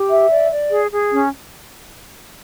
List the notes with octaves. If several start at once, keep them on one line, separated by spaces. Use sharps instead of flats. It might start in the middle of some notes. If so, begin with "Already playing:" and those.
Already playing: G4
E5
D5
D5
G#4
G#4
C#4